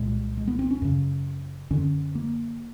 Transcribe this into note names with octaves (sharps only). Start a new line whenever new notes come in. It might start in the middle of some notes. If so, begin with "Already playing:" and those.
Already playing: C2 A#2 G#3
G#3
B3
C4
C#4
F#2 C#3
F#2 D3 C#4
A#3